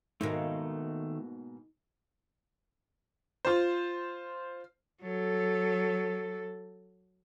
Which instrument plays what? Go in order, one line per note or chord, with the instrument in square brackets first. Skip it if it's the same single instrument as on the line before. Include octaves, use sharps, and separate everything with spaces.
[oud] G#2 B2 A#3 [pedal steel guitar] D#3 A3 [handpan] D#4
[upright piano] F4 C5
[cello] F#3 A4